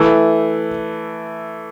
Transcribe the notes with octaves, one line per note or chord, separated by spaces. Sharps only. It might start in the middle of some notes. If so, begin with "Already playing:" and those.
Already playing: E3 A3